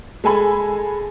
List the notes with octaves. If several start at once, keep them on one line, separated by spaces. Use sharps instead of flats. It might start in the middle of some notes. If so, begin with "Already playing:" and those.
G#3 A4 G#5 B5